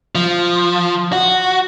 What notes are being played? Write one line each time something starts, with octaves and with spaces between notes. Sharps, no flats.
F3
F#4